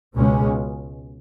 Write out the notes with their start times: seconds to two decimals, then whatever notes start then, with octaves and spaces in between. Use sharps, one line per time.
0.17 C#2 B2 G#3 C#4